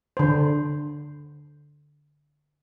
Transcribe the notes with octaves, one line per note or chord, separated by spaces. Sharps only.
D3 C5